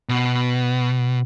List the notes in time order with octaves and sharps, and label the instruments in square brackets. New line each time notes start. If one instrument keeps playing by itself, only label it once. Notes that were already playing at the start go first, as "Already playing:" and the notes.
[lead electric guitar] B2